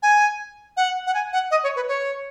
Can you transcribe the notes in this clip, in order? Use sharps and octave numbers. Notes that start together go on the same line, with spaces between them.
G#5
F#5
F#5
G#5
F#5
D#5
C#5
B4
C#5